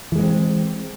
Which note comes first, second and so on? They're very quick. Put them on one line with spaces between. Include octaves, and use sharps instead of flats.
E3 G#3 B3 C4